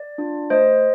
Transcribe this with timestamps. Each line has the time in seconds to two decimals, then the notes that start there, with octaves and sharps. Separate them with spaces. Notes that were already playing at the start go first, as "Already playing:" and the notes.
Already playing: D5
0.18 D4 F4
0.50 A3 C5 D#5